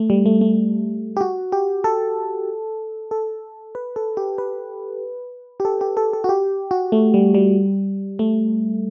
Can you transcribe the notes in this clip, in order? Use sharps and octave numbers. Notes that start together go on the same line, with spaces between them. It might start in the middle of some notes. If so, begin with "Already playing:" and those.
Already playing: A3
G3
A3
A3
G4
F#4
G4
A4
A4
B4
A4
G4
B4
G4
A4
G4
A4
A4
F#4
G4
F#4
A3
G3
G3
A3